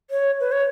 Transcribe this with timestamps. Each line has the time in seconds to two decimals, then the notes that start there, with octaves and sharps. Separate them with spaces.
0.10 C#5
0.40 B4
0.52 C#5